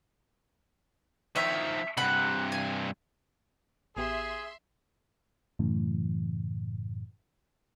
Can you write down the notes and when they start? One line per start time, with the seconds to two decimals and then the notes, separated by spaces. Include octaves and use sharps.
1.36 D#3 F3 C#5 E5
1.97 G2 C3 F#5 B5
2.52 G#5
3.97 A1 B3 G4 G#4 E5 C6
5.59 F#2 A2 C#3 E3